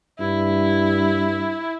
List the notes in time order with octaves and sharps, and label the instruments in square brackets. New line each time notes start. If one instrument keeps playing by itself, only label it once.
[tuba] G2 [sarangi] E4